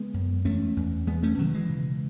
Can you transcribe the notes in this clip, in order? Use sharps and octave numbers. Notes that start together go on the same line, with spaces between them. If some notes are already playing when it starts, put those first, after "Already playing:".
Already playing: C#3 G#3 B3
F#2
E2 A3 C#4
E2
E2 G#3 B3
A3 C#4
B2 D#3 F#3
E3 G#3
C#3